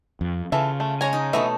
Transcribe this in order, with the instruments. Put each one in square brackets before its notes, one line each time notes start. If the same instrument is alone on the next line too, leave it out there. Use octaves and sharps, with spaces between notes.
[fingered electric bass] F2
[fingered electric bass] C#3 [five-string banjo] E3 A4 E5 [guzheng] F4
[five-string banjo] A3
[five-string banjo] G#3 G#5 [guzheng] C#5 A#5
[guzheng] D#4
[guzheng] B2 A3 D#4 [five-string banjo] E3 F#4 E5